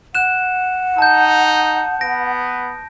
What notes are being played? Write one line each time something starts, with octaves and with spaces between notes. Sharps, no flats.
F#5 F#6 E7
D#4 A5 G6
B3 A#6 D7